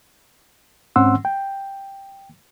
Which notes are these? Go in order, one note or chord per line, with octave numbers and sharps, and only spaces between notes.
G#2 C4 C#4 F#5 C6 E6
G5